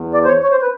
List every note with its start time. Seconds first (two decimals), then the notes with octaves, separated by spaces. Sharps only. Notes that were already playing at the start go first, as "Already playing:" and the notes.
Already playing: E2
0.14 D5
0.24 C5
0.28 C#5
0.43 C#5
0.52 C5
0.62 B4